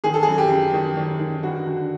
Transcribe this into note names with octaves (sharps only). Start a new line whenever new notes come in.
D#3 G#4
A4
F#2 G#4
G4
F#2
D#3
D#3
D#3
G2 F#4
D3